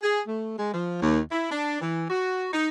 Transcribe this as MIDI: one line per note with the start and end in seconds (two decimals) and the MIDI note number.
0.03 0.21 68
0.27 0.53 57
0.57 0.70 56
0.73 0.99 53
1.01 1.20 39
1.30 1.49 64
1.51 1.80 62
1.81 2.04 52
2.10 2.46 66
2.53 2.68 63